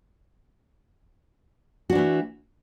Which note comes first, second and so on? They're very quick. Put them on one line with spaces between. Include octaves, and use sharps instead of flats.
F#4 D4 E3 A3